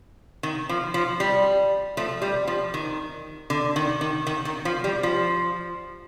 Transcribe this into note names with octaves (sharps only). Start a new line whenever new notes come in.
D#3
F3
F3
G3
F3 A3
G3
F3
D#3
D3
D#3
D#3
D#3
D#3
F3
G3
F3